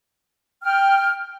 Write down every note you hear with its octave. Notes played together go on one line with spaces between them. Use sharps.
G5 F6